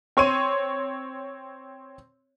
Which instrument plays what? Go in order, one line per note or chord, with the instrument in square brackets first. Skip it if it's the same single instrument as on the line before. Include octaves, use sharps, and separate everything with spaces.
[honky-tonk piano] C4 C#5 C6 D#7